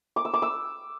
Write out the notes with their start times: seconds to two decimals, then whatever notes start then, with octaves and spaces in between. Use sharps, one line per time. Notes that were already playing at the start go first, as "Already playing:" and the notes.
0.16 D6
0.25 E6
0.34 D6
0.42 E6